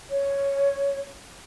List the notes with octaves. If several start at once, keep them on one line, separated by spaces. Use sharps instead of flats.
C#5